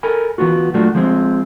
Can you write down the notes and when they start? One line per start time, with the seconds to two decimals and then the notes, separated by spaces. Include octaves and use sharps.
0.03 A4 A#4 G#5 B5
0.38 E3 B3 D4 F4 F#4
0.74 A#2 F#3 A3 D4 F4 F#4
0.95 F3 G#3 C4